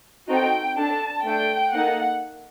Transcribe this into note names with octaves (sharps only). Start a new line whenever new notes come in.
C4 D#4 F#4 A4 G5
D4 A4 A5
A3 D4 A4 G5
A#3 D#4 A4 F#5